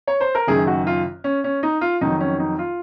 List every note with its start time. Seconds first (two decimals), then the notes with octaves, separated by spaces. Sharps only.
0.07 C#5
0.20 C5
0.35 A#4
0.47 F#1 F#2 D#3 G#4
0.67 F#4
0.87 F4
1.24 C#4
1.44 C#4
1.63 D#4
1.81 F4
2.01 F2 D#3 F#3 D#4
2.20 C#4
2.39 D#4
2.59 F4